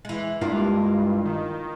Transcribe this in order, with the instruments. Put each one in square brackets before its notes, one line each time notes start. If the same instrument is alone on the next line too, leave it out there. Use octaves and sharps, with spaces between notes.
[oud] E3 G#3
[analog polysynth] G2 [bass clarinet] G#3 [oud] A#3 D4 E4 [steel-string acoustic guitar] F4
[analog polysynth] D#3